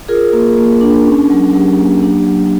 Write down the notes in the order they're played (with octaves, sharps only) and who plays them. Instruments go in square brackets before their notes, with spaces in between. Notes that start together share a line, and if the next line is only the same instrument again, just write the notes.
[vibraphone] F4 G#4 A#4
A#3
A#3
D4
C#4
F#3
F#3 G4
A#3
D4
F#3